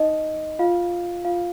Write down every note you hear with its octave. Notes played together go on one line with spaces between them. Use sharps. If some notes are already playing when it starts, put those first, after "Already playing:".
Already playing: D#4 D#5
F4 F5
F4 F5